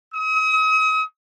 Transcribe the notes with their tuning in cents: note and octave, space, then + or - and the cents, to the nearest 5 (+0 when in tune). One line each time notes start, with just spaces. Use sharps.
D#6 +40